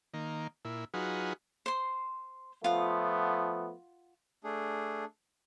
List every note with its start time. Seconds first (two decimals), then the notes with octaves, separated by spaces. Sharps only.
0.14 D#3 A#3
0.65 A#2 E4
0.94 F#3 D#4 F4 F#4 G#4 B4
1.66 C5 C6
2.64 F3 A3 B3 F4 F#5
4.44 A3 D4 G#4